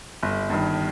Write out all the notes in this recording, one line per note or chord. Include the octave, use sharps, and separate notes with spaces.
G1
G2 D#3